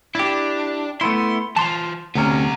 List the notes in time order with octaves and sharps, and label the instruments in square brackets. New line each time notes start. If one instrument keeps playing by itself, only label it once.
[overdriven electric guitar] D4 [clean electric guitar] E4 G4
[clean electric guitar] A3 B3 E4 [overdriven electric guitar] C6
[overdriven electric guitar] E3 F4 [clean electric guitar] A5 C6
[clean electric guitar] D2 C3 C#4 [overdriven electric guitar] B3 A#5